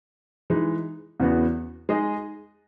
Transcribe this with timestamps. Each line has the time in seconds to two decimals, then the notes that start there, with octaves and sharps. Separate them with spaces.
0.50 E3 G#3 D#4
1.20 E2 C#3 E3 B3 F#4
1.89 G#3 D#4 G#4 D#5